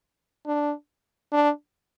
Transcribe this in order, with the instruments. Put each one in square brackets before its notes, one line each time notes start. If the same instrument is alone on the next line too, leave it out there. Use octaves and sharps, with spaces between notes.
[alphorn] D4
D4